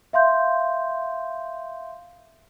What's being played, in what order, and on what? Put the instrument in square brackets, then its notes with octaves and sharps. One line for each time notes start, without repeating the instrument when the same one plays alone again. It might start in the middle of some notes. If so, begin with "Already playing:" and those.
[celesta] E5 F5 C6 G6